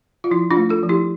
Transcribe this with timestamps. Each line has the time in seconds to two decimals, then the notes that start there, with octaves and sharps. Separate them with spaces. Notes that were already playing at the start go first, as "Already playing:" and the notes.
0.24 F4
0.31 F3 E4
0.51 D4 F4
0.57 A3
0.69 F4 A4
0.83 F3
0.89 E4 G4